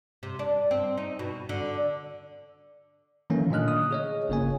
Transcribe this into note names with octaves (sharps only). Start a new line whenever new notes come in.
C3
D4
C4
D#4
B2
D3
D#3 E3 F#3 A3 A#3 C#4
A#2 D3 D4 D#5 F6 F#6
D#6
G#4 C#5 D#5
G1 C#3 A#3 C#5 G#5